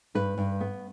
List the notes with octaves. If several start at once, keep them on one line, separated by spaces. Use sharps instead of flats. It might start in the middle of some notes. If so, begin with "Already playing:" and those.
G2 B4
G2
B3